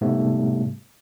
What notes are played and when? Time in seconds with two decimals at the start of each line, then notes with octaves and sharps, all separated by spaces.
0.01 E2 G#2 C3 G3 A3 B3